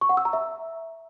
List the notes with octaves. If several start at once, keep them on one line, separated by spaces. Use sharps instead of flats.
C#6
F#5
E6
A#5
E5